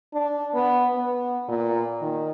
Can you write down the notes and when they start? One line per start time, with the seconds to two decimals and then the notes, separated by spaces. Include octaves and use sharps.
0.13 D4
0.54 B3
0.95 B3
1.49 A#2
2.01 D#3